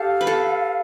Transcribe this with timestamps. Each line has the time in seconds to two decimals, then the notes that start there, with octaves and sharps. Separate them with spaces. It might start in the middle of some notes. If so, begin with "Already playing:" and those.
Already playing: G4 A4 F5
0.21 B4
0.27 A4